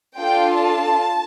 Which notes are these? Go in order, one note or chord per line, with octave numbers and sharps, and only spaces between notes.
D4 F4 A4 G5
A5